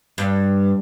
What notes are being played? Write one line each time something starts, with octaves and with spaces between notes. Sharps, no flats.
G2